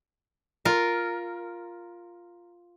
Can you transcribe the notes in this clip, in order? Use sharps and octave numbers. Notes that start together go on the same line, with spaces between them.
F4 A#4